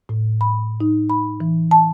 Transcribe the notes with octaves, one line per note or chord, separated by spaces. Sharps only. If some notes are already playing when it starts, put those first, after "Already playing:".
A2
B5
D#4
B5
E3
A5